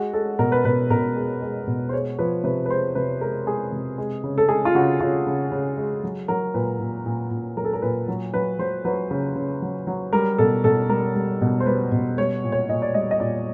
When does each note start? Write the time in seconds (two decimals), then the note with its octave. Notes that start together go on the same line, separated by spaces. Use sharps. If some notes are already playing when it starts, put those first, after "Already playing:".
Already playing: G#3 F#4
0.13 G#3 A4
0.39 B2 A#4
0.52 B4
0.65 B2 B4
0.90 B2 A#4
1.16 G#3
1.42 G#3
1.67 B2
1.89 C5
1.93 G#3 C#5
2.19 F3 B4
2.44 C3 B4
2.66 B4
2.70 G#3 C5
2.95 C3 B4
3.21 G#3 A#4
3.46 G#3 G#4
3.72 C3
3.98 G#3
4.24 C#3
4.38 A4
4.49 G#3 G#4
4.65 F4
4.75 C#3 F#4
5.00 C#3 F4
5.27 C#3
5.52 C#3
5.77 G#3
6.04 F#3
6.28 F#3 A#4
6.54 A#2 B4
6.80 A#2
7.06 A#2
7.31 A#2
7.57 F#3 A#4
7.65 A4
7.73 A#4
7.82 A#2 B4
8.08 F#3
8.34 F#3 B4
8.59 F#3 C5
8.85 F#3 B4
9.11 C#3
9.36 C#3
9.62 F#3
9.87 F#3
10.13 G3 A#4
10.38 B2 A4
10.64 B2 A4
10.89 G3 A#4
11.16 G3
11.41 B2
11.60 C5
11.66 G3 B4
11.92 B2
12.18 G3 C#5
12.44 A#2
12.52 C#5
12.69 A#2 D#5
12.82 D5
12.94 G3 D#5
13.11 D#5
13.20 A#2 D5